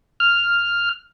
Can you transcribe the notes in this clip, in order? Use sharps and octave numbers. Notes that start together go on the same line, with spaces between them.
F6